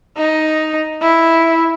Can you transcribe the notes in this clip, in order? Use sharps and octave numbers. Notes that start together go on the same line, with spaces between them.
D#4
E4